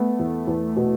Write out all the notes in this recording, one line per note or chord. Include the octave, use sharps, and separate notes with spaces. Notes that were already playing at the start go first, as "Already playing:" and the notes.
Already playing: A3 B3
E2
E2
B2